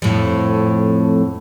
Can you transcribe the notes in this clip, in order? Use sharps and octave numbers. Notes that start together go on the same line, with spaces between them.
F2 A2